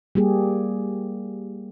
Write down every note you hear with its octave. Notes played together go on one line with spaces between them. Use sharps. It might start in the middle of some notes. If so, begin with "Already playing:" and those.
G3 A#3 G4 G#4